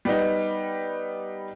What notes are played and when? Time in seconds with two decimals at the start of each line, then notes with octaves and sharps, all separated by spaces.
0.05 G3 B3 D#4